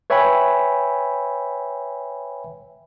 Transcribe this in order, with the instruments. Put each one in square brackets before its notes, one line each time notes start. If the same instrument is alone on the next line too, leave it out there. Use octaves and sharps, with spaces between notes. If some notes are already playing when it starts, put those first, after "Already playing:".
[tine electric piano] B4 C#5 E5 G5 G#5 B5